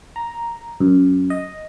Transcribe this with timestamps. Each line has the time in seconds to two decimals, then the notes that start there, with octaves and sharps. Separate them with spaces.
0.16 A#5
0.80 F#2
1.30 D#5